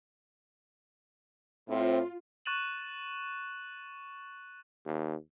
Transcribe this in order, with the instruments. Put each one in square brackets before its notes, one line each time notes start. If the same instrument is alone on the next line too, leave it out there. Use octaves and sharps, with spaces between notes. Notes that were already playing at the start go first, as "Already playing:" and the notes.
[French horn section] A2 C4 [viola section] F4
[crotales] C#6 F#6 A6 D#7 E7 F#7
[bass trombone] D#2